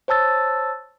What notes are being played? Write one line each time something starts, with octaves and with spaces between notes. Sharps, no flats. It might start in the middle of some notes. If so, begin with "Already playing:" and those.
C5 C#5 A5 E6 A6